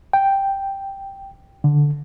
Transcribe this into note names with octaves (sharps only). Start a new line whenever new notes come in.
G5
D3